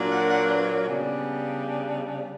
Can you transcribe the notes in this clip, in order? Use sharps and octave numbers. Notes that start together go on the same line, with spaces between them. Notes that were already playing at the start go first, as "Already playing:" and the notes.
Already playing: A#2 F#3 A#3 D4
F#5
F#5
B4
C#5
C#3 G3 B3 D4 D5